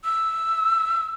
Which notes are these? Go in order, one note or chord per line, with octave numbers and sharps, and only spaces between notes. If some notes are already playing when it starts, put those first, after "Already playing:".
E6